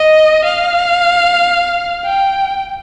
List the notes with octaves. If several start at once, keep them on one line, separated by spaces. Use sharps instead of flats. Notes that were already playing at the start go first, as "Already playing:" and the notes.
Already playing: D#5
F5
G5